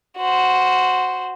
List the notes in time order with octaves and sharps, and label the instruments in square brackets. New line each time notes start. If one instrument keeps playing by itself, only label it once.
[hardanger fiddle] F#4 C5